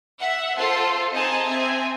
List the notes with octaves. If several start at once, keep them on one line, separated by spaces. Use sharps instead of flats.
E5 F#5
F4 A4 C5 A5 C6
C4 D#4 G#4 D#5 G#5 A5
C4 E5 G#5